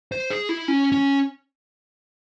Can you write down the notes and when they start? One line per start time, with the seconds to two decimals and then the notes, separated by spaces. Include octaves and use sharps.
0.12 C5
0.30 G#4
0.49 E4
0.68 C#4
0.92 C#4